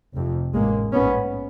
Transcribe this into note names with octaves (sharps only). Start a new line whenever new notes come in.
F1 F2 C3
A1 G#2 G#3 A#3
A#1 G#2 B3 C#4